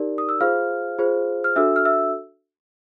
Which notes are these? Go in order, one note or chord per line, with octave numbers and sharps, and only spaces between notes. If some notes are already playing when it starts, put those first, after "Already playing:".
Already playing: D#4 G4 A#4 D5
D#6
E6
F4 G#4 C5 F5 F6
F4 G#4 C5
F6
D4 F#4 A4 E5 E6
F6
E5 E6